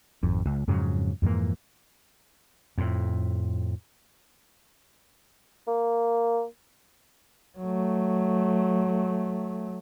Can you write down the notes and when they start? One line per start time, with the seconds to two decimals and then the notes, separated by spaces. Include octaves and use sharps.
0.23 G#1 F2
0.45 C#2
0.68 F2 G#2 C#3 F#3
1.22 F2 G#2 E3 A#3
2.78 F2 A2
5.67 A#3
7.59 F#3 A3